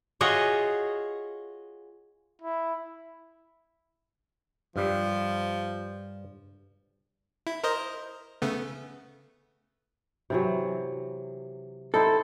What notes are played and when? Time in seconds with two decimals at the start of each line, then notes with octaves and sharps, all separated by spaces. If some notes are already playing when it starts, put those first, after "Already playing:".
0.21 F4 F#4 G#4 C#5 D#5 E5
2.42 E4
4.76 G2 F3 G3
7.47 E4
7.64 A#4 C5 D#5
8.42 C#3 A3 B3
10.30 C3 E3 F#3
11.94 D#4 E4 A4 C5